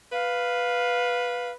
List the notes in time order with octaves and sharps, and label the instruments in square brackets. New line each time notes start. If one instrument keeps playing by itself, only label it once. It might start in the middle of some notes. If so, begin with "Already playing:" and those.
[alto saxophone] B4 [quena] F5